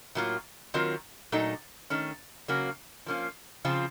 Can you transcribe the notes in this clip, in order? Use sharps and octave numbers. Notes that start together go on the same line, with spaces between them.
A2 F#3 A#3 F4
D#3 F#3 C4 F4 A#4
A#2 F#3 A3 D#4
D#3 A3 C#4
C#3 F#3 A#3 C#4 F#4
F3 A#3 C#4 F4
C#3 F3 C4 F4